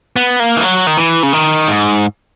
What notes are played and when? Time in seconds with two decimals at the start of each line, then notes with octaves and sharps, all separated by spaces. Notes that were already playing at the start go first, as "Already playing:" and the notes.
0.16 B3
0.40 A#3
0.56 E3
0.62 F#3
0.87 D#3
0.97 E3
1.23 C#3
1.33 D#3
1.68 G#2